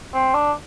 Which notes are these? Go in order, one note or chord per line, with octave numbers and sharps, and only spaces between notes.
C4
D4